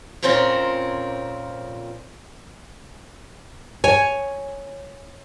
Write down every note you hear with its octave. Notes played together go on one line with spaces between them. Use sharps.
F2 A#2 C4 C#4 F4 A#4
C#5 G#5